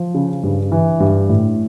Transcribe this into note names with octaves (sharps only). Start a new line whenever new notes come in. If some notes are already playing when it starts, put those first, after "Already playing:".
Already playing: F3
C#3
G2
E3
G2
A2